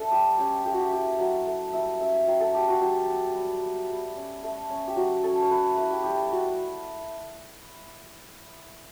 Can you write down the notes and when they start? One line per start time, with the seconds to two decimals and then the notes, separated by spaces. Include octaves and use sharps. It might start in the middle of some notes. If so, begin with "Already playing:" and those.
Already playing: A3 D4 A4 E5
0.11 G3 G4
0.38 C#4 G4
0.65 A3 G4
0.73 F#4
0.81 G4
0.92 E4 G4
1.19 F#3 F#5
1.47 A3
1.73 G3 E5
2.00 C#4 E5
2.27 F#3 G5
2.40 A4
2.54 C#4 G4
2.68 F#4
2.81 F#3 G4
3.08 B3
3.36 G3
3.62 B3
3.88 G3
4.16 C#4
4.43 A3
4.70 C#4
4.87 G4
4.96 F#3 F#4
5.23 C#4 A4
5.42 C#5
5.50 A3 B4
5.77 E4 B4
5.91 G4
6.04 G3 G4
6.31 D4 F#4